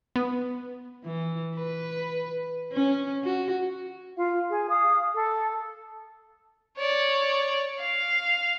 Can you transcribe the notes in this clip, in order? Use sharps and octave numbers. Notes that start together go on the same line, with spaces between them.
B3
E3
B4
C#4
F#4
F4 F5
G#4
F5 D#6
A4
C#5 D5
F5